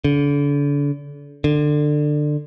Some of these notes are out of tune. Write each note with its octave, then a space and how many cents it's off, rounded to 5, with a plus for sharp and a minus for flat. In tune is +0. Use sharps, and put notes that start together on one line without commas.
D3 -35
D3 +20